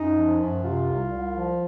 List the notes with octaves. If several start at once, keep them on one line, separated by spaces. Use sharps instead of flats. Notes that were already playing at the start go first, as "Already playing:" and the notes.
Already playing: F#2 D#4
F3
F#2
C3 F4
C2
C2
F3